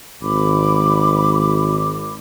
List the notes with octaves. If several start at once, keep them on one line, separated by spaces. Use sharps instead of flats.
G#1 B5 D6